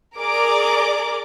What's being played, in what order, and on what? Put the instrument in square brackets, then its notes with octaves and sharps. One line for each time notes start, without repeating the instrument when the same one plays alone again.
[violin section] G#4 A#4 D5 D6